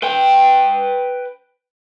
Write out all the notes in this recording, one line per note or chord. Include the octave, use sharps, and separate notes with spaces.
B4 G5